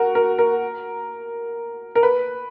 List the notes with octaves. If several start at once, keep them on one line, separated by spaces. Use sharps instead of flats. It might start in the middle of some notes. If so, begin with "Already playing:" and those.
Already playing: F#4 A#4
A#4
A#4
A#4
B4